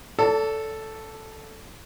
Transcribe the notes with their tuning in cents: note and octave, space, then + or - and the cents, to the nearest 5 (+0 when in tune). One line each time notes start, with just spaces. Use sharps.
A4 +0 D5 -40 A5 +30